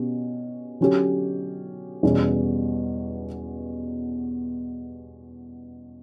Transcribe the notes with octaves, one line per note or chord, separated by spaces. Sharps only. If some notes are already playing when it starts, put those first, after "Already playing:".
Already playing: B2 C#4 G4
D3 F#3 C#4 G4
E2 B2 G3 C#4